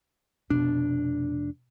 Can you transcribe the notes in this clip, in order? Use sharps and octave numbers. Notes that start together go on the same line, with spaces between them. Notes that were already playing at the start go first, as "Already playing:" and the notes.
F1 B2 D4